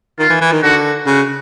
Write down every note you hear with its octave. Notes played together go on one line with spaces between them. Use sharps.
D#3 F4
E3
E3
D#3
D3 F#4
C#3 F#4